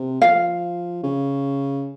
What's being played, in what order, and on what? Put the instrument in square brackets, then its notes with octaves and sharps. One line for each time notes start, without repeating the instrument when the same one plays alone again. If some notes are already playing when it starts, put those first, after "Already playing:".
Already playing: [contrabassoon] C3
[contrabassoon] F3 [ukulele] F5
[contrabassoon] C#3